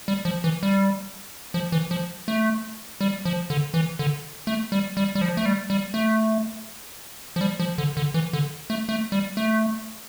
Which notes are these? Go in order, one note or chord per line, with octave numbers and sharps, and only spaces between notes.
G3
F3
E3
G3
F3
E3
F3
A3
G3
F3
D3
E3
D3
A3
G3
G3
G3
F3
A3
G3
G3
A3
F3
G3
F3
D3
D3
E3
D3
A3
A3
G3
A3